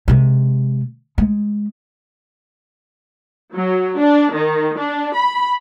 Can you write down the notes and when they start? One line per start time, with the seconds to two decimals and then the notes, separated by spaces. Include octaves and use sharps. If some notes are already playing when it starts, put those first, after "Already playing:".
0.08 C3 G#3
1.18 G#3
3.54 F#3
4.00 D4
4.33 D#3
4.80 D4
5.15 B5